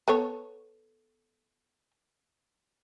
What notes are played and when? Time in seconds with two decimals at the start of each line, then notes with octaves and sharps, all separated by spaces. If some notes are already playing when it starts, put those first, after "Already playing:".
0.08 B3 A4 C#5